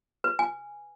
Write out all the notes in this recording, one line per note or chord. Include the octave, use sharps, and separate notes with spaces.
B4
G#5